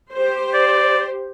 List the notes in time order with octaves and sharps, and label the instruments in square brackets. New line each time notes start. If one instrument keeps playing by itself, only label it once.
[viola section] G4 C5
[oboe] D5